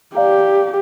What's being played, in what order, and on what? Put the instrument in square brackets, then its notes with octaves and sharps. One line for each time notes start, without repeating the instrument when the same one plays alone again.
[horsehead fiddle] G4 [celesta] D5 F5 A#5